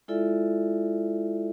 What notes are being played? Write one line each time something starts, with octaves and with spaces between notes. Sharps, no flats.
G#3 E4 F4 A4 D5 E5